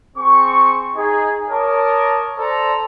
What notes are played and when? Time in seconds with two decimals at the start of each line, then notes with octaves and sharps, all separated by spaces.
0.17 C4 G#4 C#6
0.96 D#4 G#4
1.50 A#4 C#5 A5 D6 D#6
2.37 A4 C5 D5 A5 A#5